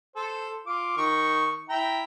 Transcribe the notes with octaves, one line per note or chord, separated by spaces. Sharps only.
A4 C5
F4 D6
D#3 C#6
E4 G5 A#5